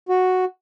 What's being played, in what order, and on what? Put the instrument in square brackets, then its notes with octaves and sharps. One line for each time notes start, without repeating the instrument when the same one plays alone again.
[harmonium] F#4